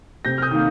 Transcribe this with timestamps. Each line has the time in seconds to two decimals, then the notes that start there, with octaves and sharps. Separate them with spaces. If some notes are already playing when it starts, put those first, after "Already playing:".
0.25 C3 G6 A#6
0.38 F6
0.42 D#6 G6
0.51 D#3 A#3